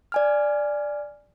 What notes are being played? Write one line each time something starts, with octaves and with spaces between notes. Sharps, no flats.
D5 G#5 F6